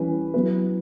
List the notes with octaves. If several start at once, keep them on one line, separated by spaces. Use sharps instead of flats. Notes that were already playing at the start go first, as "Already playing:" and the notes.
Already playing: E3 G3 C#4 B4
F#3 B3 E4 B4